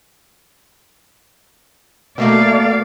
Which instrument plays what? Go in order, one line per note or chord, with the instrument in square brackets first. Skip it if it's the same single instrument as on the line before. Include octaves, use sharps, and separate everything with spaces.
[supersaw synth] B2 A3 A#3 [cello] D5 F5